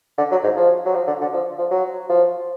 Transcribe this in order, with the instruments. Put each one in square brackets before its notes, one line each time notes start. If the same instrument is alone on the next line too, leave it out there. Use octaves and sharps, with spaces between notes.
[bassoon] D3
F#3
G#2
F3
F#3
F3
D3
D3
F3
F3
F#3
F3